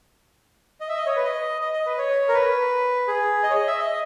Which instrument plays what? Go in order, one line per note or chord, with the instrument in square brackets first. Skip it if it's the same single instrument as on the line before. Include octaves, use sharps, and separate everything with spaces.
[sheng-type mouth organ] D#5
E5
D#5
C#5
B4
D#5
D#5
D#5
B4
C#5
A#4
B4
G#4
D#5
C#5
D#5
E5
D#5